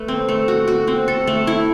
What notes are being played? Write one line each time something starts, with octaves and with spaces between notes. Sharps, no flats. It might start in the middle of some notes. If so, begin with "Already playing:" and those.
Already playing: A3 B4
C4
A3
F#4
F#4
C4
A4
A3
E4